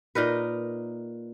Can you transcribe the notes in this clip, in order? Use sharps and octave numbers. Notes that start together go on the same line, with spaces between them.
A#2 D#4 A#4 B4